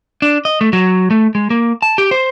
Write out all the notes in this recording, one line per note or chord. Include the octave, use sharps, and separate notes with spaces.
D4
D#5
A3
F#3
A3
G#3
A#3
A5
G4
C5